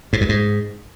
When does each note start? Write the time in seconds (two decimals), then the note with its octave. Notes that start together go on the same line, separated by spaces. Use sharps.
0.13 G#2
0.21 G2
0.29 G#2